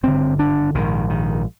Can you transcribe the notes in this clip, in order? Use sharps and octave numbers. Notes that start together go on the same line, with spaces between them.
G#1 G2 D3 C4
D4
A#1 G#2 D#3
D#3